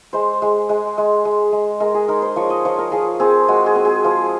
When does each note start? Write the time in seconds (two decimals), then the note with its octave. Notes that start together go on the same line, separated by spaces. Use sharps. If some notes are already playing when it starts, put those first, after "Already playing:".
0.13 G#3 C5
0.42 G#3
0.69 G#3
0.98 G#3
1.25 G#3
1.52 G#3
1.80 G#3 A#4
1.94 G#4
2.08 D#4 A#4
2.22 C5
2.36 F3 C#5
2.50 D#5
2.65 F3 C#5
2.79 A#4
2.92 F3 G#4
3.20 C4 G#4
3.48 G#3 F#4
3.66 G#4
3.75 C4
3.85 G#4
4.04 F3 F4